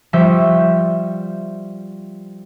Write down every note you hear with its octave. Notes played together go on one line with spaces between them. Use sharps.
F3 G3 E5 C#6 G6